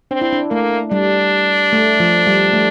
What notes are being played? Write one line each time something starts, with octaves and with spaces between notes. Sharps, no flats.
C4 D4
E4
D4
A3 A#3
G3 D4
A3
F3
G3
A3